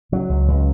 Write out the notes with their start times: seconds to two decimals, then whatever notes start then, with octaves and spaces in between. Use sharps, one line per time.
0.12 C#3 F#3
0.29 C#2
0.48 C#2